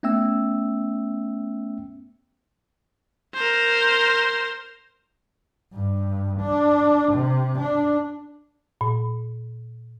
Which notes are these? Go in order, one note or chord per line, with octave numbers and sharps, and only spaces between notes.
A3 B3 C#4 E5 G5 E6
A#4 C5
G2
D4
C3
D4
A#2